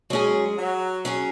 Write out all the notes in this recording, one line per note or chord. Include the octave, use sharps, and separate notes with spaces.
F#3 G#3 C#4 G#4
F#3
F#3 C#4 G#4